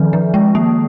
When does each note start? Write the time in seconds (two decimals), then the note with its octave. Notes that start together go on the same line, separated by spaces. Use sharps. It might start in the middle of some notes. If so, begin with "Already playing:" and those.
Already playing: D#3 F3
0.13 F3
0.34 G#3
0.55 A#3